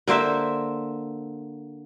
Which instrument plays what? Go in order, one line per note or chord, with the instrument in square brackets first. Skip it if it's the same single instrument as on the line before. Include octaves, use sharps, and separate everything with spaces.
[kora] D3 A#3 C5 E5